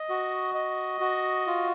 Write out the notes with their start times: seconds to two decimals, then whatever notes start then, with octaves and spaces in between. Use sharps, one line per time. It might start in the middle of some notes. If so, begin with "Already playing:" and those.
Already playing: D#5
0.09 F#4
0.55 D#5
1.01 F#4
1.47 F4